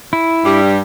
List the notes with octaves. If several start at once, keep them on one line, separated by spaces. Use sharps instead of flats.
E4
G2 G3